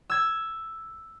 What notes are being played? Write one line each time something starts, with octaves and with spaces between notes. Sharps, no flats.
E6 G#6